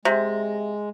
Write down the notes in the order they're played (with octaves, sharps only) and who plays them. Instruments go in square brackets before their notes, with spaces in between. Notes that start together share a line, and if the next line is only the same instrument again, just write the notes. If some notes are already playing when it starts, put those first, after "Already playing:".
[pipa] C3 [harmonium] G#3